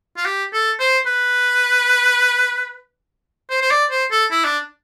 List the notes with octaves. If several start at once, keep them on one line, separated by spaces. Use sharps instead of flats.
F4
G4
A4
C5
B4
C5
C5
D5
C5
A4
E4
D4